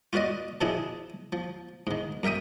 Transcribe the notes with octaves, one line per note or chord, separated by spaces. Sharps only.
F4 F#4 B4 D5 D#5
B2 D#3 F3 D4 E4 G#4
F3
G#2 D#3
F#2 A#4 E5 G5 D#6